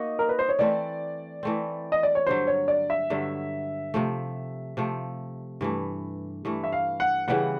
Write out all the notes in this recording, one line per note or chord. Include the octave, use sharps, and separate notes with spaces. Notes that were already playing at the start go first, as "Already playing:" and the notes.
Already playing: A#3 D#4 F#4 D#5
A#4
B4
C5
C#5
E3 A3 C4 D5
E3 A3 C4
D#5
D5
C#5
G2 D3 F#3 C5
C#5
D5
E5
G2 D3 F#3
C3 F3 A3
C3 F3 A3
G2 E3 A3
G2 E3 A3
E5
F5
F#5
C#3 E3 G3 B3 F#5